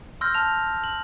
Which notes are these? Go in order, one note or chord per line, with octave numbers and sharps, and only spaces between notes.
C6 E6 F6 G6 A#6
A5 F6 F7
F#7